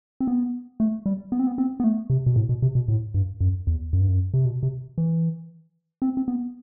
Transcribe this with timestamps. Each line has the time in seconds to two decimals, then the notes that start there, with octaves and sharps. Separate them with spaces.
0.20 C4
0.27 B3
0.80 A3
1.06 G3
1.32 B3
1.39 C4
1.47 B3
1.58 C4
1.80 B3
1.84 A3
2.10 C3
2.26 B2
2.36 A2
2.49 B2
2.62 C3
2.75 B2
2.88 A2
3.14 G2
3.41 F#2
3.67 E2
3.93 F#2
4.01 G2
4.08 F#2
4.34 C3
4.45 B2
4.63 C3
4.98 E3
6.02 C4
6.17 C4
6.28 B3